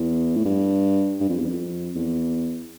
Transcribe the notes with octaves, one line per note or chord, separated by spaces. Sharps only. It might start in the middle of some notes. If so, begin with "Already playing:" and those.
Already playing: E2
A2
G2
G2
F2
E2
F2
E2